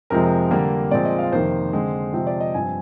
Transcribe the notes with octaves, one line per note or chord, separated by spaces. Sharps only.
F2 C3 F3 G#3 C4 A#4
D3 G3 A#3
A#2 F3 G#3 C4 D5
D#5
F5
F2 C3 D#3 A#3 C5
D3 G#3 C4
C3 F3 G#3 C4 C5
D5
D#5
G2 F3 C4 G#5